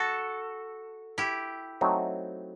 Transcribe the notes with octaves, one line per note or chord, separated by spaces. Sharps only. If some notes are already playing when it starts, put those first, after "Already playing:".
Already playing: F#4 A4
E4 G4
F#3 A3 C4 D#4